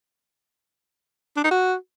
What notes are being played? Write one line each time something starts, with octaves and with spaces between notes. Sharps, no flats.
D4
D#4
F#4